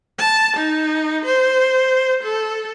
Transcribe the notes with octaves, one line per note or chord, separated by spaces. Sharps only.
A5
D#4
C5
A4